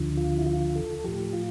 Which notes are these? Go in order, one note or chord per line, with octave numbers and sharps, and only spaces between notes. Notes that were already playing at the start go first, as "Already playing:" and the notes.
Already playing: D2 D3 F3
F4
E4
F4
A4
A2 F3 G4
F4